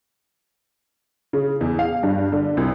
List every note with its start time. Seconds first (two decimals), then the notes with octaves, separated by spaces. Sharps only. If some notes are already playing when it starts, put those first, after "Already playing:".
1.33 C#3
1.61 E2
1.79 F5
2.03 G2
2.32 D3
2.57 C2